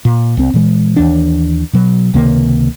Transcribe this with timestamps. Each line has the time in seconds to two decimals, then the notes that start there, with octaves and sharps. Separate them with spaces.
0.05 A#2
0.37 C2 C4
0.54 A#2 E3 G#3
0.96 D#2 E3 D4
1.73 B2 F#3
2.14 C#2 C3 D#3 A#3